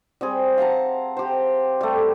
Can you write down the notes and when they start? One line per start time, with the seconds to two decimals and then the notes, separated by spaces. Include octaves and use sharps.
0.21 G3 C4 G#4
0.58 F5 F#5 A5 A#5
1.17 G4 C5
1.81 G3 A3